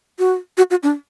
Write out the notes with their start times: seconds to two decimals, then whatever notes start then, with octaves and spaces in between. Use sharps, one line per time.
0.19 F#4
0.57 F#4
0.70 F#4
0.83 D4